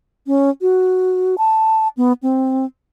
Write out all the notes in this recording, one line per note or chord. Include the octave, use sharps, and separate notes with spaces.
C#4
F#4
A5
B3
C4